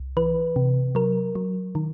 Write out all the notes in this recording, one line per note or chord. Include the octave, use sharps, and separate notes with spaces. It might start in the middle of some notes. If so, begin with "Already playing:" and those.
Already playing: C2
E3 B4
C3
F#3 A#4
F#3
D#3